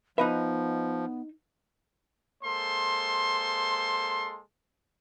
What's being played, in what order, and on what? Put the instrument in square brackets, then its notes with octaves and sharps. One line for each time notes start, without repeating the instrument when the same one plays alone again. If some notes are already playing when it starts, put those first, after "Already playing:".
[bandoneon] F3 [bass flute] B3 [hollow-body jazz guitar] D#4 D#5 E5 [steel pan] B4
[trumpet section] G#3 A#3 A4 C5 C6